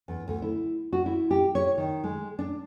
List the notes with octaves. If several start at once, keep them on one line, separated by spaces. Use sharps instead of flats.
E2
D2
E4
F#4
E4
G4
C#5
D#3
G#3
D4